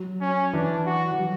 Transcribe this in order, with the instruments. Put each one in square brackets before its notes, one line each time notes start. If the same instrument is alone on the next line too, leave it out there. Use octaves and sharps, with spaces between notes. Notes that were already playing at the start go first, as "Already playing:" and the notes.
Already playing: [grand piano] F#3
[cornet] C#4
[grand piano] E3 [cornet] D4
[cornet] F#4
[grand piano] E3
F#3